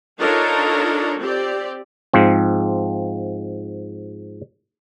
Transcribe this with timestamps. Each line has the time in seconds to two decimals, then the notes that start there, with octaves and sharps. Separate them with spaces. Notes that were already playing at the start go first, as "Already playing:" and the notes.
0.20 D4 D#4 F4 A4 A#4 C#5
1.20 C4 G4 D5
2.14 G#2 F3 C4